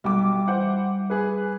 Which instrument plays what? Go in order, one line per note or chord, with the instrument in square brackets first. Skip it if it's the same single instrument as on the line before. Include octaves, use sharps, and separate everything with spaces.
[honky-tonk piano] B1 F#4 D6 [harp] G3
[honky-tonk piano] E3 C5 F#5
G#4 B4